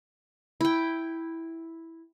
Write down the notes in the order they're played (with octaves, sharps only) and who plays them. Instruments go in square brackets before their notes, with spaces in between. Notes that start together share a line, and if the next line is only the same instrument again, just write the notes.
[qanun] E4 G5